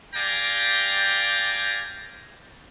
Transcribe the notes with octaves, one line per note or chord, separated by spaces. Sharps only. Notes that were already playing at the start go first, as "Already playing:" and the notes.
G4 D5 F5 G5 G#5 A#5